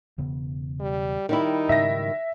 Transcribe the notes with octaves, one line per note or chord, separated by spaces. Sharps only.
E1 C#3 B3
G3
D#3 G3 D#4 E4
G#2 C#3 F#3 E5 A#6